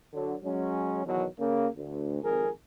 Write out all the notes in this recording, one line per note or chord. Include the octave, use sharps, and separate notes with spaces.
D3 F#3
F#3 G#3 C#4
E2 B2 D#3 F#3
C#3 A#3
D2
G#1 F2 G#4 A#4